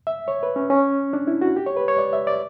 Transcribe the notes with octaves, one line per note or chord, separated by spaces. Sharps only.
E5
C#5
B4
C#4
C#4
D4
E4
F#4
G4
C#5
B4
C#5
D5
E5
D5